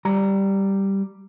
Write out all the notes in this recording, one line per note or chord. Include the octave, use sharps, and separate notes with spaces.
G3 A#5